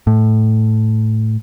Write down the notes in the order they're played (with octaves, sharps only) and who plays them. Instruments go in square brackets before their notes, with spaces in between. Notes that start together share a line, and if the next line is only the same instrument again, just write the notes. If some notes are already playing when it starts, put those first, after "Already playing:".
[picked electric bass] A2